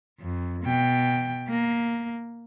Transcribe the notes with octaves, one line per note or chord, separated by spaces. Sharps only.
F2
B2 G5
A#3